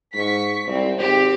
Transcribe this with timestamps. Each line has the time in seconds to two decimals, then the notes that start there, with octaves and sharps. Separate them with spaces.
0.14 G#2 C#6 B6
0.68 C2 C4
1.00 G#1 C4 G4